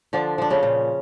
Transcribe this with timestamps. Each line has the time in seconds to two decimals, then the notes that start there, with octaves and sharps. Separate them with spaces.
0.13 D3 F3 D4
0.38 F3 D4
0.50 C#3 C#4
0.63 A#2